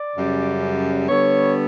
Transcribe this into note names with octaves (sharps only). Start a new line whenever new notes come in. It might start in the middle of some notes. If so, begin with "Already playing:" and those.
Already playing: D5
F#2 C#3 G3
D3 G3 B3 C#5